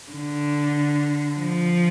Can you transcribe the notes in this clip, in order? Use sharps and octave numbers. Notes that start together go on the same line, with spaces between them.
D3
F3